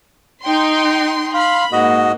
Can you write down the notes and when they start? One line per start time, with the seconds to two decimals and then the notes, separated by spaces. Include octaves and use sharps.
0.44 D#4 G5 C6
1.34 F5 B5 C6
1.72 G#2 A#3 F#4 D#5